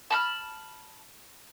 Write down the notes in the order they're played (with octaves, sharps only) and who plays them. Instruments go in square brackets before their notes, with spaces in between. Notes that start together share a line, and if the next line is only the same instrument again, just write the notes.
[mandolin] A5 B5 F6